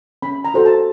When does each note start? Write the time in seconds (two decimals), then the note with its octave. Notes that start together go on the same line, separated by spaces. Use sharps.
0.22 C#4 B5
0.45 A#5
0.54 F#4 A4 C5
0.66 A5